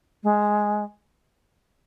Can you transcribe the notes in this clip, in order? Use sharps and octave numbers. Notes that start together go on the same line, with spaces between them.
G#3